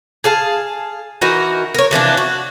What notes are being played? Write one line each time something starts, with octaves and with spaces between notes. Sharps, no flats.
G#4 F5 A5
E3 D#4 F#4 A#4
A#4 C#5
C3 E3 F3 D4
F#4